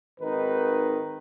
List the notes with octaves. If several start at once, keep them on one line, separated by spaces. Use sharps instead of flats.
G#1 D#3 D#4 B4